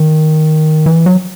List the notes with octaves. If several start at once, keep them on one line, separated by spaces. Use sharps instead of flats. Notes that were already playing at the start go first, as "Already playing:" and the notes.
Already playing: D#3
E3
F#3